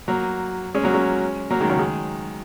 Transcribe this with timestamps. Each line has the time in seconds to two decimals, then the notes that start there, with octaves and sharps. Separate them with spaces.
0.08 F#3 A#3
0.74 G#3 C#4
0.83 F#3 A#3
0.94 G#3 C#4
1.50 F#3 A#3
1.61 D#3 G#3
1.69 C#3 F#3
1.79 D#3 G#3